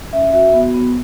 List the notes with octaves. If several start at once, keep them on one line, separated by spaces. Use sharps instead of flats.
C#4 E5
F#4 E5
B3
B3